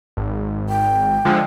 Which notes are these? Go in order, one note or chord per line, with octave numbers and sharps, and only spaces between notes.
G#1
G5
D3 F3 G#3